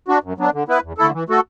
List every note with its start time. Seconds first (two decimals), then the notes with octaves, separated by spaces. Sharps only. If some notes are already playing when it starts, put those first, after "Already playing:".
0.08 D4 F#4
0.23 F#2
0.38 F#3 B3 D4
0.54 D3
0.68 B3 E4 B4
0.83 E2
0.98 D3 A3 E4 A4
1.14 E3
1.29 A3 F#4 A4